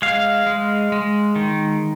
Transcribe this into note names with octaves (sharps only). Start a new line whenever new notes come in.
G#3 F5
G#3
G#3
D#3